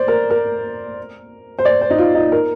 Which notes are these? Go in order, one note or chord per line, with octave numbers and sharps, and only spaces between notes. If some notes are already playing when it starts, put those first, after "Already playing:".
Already playing: C5 D5
A#4
A#4
C5
D5
C5
D#4
F4
D#4
A#4